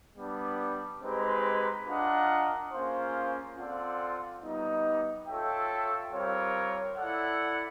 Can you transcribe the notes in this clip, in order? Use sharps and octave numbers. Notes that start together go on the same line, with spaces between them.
G3 B3 D4
G#3 C4 D#4 G4 B4
D4 F4 A#4 D#5 F#5
A#3 C#4 F4 G#4 C5
C4 F4 A4 D5 F#5
G3 B3 D#4
F4 A4 C#5 E5 G5
G3 C4 F4 A#4 C#5
E4 A4 D5 F#5